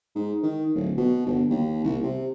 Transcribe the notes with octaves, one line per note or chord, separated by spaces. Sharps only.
G#2
D#3
D1
B2
G1
D#2
C2
C3